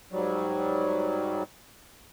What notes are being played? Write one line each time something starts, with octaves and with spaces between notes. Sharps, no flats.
G#2 F#3 G3